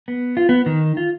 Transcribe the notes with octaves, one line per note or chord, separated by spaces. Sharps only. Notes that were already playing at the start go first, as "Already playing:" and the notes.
B3
F4
B3
D#3
F4